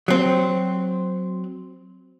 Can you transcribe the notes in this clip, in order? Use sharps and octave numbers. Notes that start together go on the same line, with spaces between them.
F#3 C4